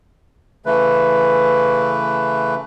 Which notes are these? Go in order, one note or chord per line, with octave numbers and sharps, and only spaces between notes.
C#3 E3 A3 B4